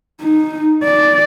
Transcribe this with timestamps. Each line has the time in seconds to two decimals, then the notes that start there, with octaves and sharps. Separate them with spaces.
0.22 D#4
0.84 D5